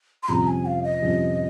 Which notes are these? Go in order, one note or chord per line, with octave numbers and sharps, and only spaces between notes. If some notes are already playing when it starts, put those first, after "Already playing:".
C6
F2 C3 G3 C#4 F4 A#5
G#5
F5
D#5
F2 C3 G3 C#4 F4